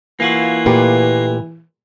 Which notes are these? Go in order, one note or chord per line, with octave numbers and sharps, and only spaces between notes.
E3 A#3 F4 F#4
A#2 A3 G4 B4